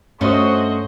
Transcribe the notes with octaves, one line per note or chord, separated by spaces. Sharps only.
G2 A3 C#4 F#4 C5 D#5